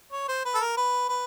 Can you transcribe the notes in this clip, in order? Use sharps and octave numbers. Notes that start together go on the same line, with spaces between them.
C#5
C5
B4
A4
A#4
B4
B4